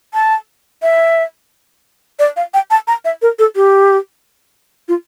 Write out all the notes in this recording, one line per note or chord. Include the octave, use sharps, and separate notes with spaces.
A5
E5
D5
F5
G5
A5
A#5
E5
A#4
A4
G4
F4